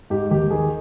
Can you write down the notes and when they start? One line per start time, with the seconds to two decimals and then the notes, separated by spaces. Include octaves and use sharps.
0.10 G#2 G4
0.31 D#2 G4
0.50 D#3 G#4